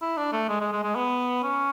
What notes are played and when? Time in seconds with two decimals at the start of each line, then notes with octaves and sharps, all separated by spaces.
0.01 E4
0.17 D4
0.32 A3
0.48 G#3
0.60 G#3
0.72 G#3
0.83 G#3
0.95 B3
1.43 C#4